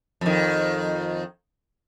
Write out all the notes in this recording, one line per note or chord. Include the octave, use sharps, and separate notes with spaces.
F2 D#3